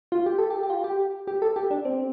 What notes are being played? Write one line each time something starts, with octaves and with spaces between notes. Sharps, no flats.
F4
G4
A4
G4
G4
F4
G4
G4
A4
G4
D4
C4